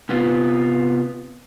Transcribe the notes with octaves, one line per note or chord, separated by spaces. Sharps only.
C3 B3 F4